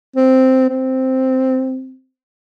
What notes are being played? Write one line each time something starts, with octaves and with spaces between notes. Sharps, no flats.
C4
C4